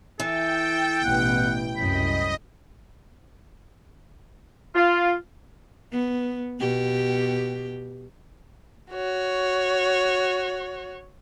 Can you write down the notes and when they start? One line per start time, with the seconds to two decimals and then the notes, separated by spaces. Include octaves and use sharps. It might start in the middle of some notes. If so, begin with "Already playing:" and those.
0.20 E3 A4 G5
1.04 A1 B2 B3 F#5
1.77 C2 F#2 D#5 B5
4.75 F4
5.92 B3
6.60 B2 G4
8.92 F#4 C#5